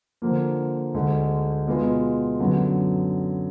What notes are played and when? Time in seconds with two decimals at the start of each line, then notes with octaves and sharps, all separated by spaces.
0.22 D3 F3 A#3
0.94 D2 D3 G#3
1.67 B2 G#3 B3 F4
2.40 F#2 D3 F#3 B3